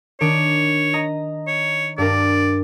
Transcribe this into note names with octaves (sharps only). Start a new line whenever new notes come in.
D#3 D4 C#5 D7
D#5 A#5
C#5
G2 D4 A#4 D5